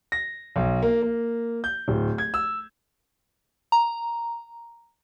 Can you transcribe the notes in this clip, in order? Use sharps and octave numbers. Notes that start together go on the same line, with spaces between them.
A#6
B1
A#3
A#3
G6
D1
G#6
E6
A#5